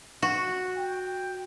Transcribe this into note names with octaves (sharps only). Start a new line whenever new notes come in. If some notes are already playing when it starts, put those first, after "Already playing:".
F#4
G5